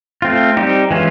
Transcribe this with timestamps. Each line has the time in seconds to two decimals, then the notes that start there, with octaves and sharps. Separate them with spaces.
0.22 A3 C4 F4
0.57 G3 C4 D#4 G4
0.91 E3 G#3 C#4 F4